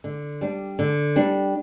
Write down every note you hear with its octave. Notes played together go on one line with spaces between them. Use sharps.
D3
G3 D4
D3
G3 D4